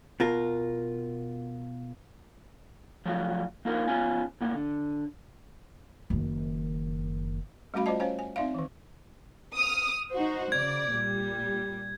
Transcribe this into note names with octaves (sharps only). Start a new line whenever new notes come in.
B2 F4 A#4
F3 F#3 A3
A#3 D#4 F4 A#4 C5
B3 C#4 F4 G#5
A2 A#3 F#5
D3
F#1 D#3
G3 A3 C#4 F#4 F5 B5
F4 C5 D5 D#5 A5
C#4 C5 C#5 F5 G#5
G#5
C4 D#4 D5 E5 F5
D#3 E3
D#6 F6
D#4 F#4 C5
C#3 D5 G#6
A#2 G3